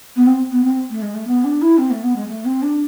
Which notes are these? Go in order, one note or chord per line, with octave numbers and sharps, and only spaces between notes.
B3
C4
B3
C4
A3
G#3
A3
B3
D4
E4
C4
A3
B3
G#3
A3
C4
D4